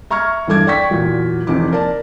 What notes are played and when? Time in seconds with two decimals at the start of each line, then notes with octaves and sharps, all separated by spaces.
0.10 E5 A#5 C#6 F6 G#6
0.48 E2 G2 A4 D6 G#6
0.67 D5 G5 C#6 B6
0.91 E2 A#2 F#3
1.47 F1 E2 C3 D#4 D6
1.72 A#3 A#4 D5 A5